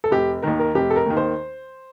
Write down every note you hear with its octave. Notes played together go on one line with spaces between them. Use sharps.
A4
F1 G4
D#2 D#3 A#4
A#4
F1 G4
A4
A#4
D#2 D#3
C5